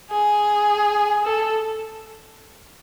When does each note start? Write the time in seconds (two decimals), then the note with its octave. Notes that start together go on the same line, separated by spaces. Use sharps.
0.11 G#4
1.25 A4